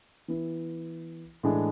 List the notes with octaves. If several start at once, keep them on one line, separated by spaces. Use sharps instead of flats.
E3 B3 E4
A2 E3 G#3 D4 G#4